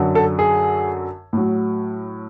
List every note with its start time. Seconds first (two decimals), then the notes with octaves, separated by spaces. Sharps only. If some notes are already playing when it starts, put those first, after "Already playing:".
Already playing: F#2 D3 F#3
0.15 A4
0.39 G#4
1.33 A2 F#3